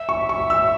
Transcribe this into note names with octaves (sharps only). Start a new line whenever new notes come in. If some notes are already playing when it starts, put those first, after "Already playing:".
Already playing: E5
C#6
C#6
E6